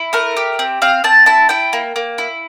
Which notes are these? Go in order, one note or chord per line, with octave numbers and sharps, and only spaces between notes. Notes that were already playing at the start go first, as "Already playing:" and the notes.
Already playing: E4
A3 A#4
G4
C4
C4 F5
C4 A5
E4 A5
E4 G5
A#3
A#3
E4